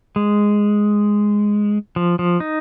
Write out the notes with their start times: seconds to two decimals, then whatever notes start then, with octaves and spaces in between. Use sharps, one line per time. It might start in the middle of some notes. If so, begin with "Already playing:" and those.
0.16 G#3
1.96 F3
2.19 F3
2.40 D#4